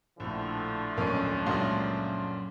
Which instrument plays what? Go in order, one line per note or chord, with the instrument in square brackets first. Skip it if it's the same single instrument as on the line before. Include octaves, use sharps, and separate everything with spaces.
[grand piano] A#1 A2 [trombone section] D3 F3 A3
[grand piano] D#1 B1 F2 [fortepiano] A#3 C#4
[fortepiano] C#2 G#3 [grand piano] F#2 A#2 C#4